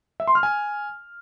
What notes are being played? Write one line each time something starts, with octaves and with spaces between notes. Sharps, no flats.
E5
C6
F6
G#5